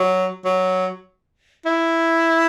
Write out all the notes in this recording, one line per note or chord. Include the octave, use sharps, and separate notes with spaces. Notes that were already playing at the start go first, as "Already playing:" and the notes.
Already playing: F#3
F#3
E4